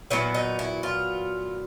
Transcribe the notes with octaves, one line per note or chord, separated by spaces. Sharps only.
A#2 F#3 B3 E4
D#4
E4
F4